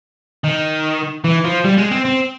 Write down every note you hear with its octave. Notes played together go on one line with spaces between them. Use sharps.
D#3
E3
F3
G3
G#3
C4
C4